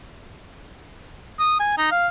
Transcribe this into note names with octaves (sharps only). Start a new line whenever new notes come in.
D#6
G#5
D#4
F5